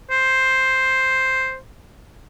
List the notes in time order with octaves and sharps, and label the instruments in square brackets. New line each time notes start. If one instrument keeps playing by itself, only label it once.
[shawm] C5